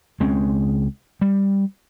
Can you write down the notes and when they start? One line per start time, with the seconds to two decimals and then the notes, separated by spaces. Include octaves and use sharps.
0.20 C#2 G#3 C4 C#4
1.21 G3